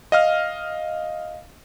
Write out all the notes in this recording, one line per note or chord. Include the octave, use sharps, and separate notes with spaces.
D#5 F5 F6